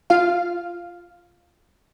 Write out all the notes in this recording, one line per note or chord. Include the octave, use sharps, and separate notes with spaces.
F4 F5